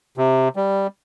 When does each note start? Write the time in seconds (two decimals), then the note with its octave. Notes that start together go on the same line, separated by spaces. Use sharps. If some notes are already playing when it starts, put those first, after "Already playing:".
0.17 C3
0.56 G3